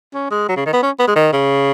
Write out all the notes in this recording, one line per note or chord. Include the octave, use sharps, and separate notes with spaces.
C#4
G#3
F#3
C#3
D#3
B3
C#4
B3
G#3
D#3
C#3